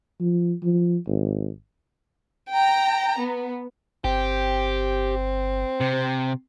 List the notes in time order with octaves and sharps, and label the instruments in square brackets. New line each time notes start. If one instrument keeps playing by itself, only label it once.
[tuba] F3
F3
G#1
[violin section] G5 A#5
B3
[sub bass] G1 [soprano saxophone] C4 [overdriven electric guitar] G4
[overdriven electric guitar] C3